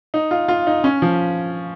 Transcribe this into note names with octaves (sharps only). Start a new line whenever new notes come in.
D#4
F4
F4
D#4
C#4
F3